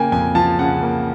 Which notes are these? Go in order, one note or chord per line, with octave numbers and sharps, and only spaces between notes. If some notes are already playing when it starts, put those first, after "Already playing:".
Already playing: C#3 A#3 G5 G#5
F2 G#5
F3 A5
C#3 F#5
A#3